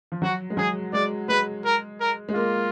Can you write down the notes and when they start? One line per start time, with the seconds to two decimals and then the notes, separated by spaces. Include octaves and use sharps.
0.12 F3
0.22 F#3 F#4
0.50 G#3
0.57 F#3 G#4
0.93 G#3 D5
1.29 G#3 B4
1.65 A#4
2.00 A#4
2.29 G#3
2.35 A#3 F4